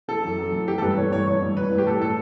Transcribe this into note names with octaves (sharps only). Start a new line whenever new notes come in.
E3 A4
F#2
F#2
E3
E3 G4
A4
G2 B4
E3 C#5
G2 C#5
E3 C#5
G2
E3 B4
G2
G4
A2 A4
A2 A4